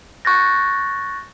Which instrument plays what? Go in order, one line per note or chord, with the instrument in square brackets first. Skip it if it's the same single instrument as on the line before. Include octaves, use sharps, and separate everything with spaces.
[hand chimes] C#6 F#6 G6 A6 A#6